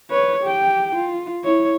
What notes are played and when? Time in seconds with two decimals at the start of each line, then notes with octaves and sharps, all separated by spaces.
0.10 B4 C#5
0.43 G4 G5
0.96 F4
1.44 E4 C#5